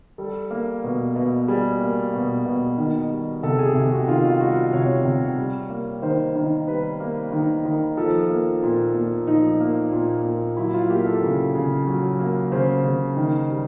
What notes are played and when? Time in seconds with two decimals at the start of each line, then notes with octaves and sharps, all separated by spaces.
0.18 G3 A4
0.51 A#3
0.84 B2
1.15 B2
1.48 G3 G#4
1.80 A#3
2.14 B2
2.46 B2
2.78 D#3
3.10 G3
3.43 C3 A4
3.59 G#4
3.75 C3 G4
3.92 F#4
4.08 D#3 F4
4.23 F4
4.40 G3 F#4
4.73 C3 C#5
5.05 C3
5.38 G3
5.70 A#3
6.02 D#3 C5
6.36 D#3
6.67 G3 B4
7.00 A#3
7.32 D#3
7.65 D#3
7.97 F3 A4
8.30 A#3
8.63 A#2
8.94 A#2
9.27 F3 D#4
9.60 A#3
9.92 A#2
10.25 A#2
10.57 F#3 E4
10.73 F4
10.89 A#3 G4
11.06 A4
11.22 C#3
11.55 C#3
11.87 F#3
12.19 A#3
12.52 C#3 C5
12.84 C#3
13.17 D#3
13.50 G3